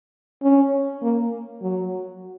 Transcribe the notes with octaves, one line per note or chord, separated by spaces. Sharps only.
C#4
A#3
F#3